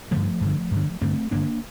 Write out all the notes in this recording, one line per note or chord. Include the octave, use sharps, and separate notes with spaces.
G2 D3 F3 A3
G2 D3
G2 D3
G2 D3 A3 C4
G2 D3 A#3 D4